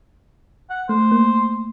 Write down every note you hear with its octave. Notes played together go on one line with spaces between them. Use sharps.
F#5
A3 C5
A#3